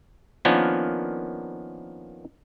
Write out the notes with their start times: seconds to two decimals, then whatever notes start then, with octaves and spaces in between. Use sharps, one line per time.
0.45 D#3 F3 A#3 B3 C#4 D4